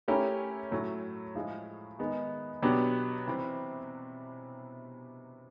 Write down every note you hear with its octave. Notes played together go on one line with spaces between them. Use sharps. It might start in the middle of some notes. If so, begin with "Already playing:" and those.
A3 C#4 E4 G4 A#4
A2 F#3 A3
A2 F3 G#3
D#3 G#3 B3 D#4
B2 F#3 B3 D4 G4
C3 E3 G3 C4